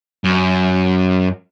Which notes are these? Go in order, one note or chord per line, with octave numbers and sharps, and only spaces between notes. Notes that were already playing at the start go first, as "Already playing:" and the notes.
F#2